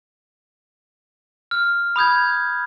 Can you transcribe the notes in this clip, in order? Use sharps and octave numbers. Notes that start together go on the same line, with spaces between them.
F6
B5 D#6 G6 G#6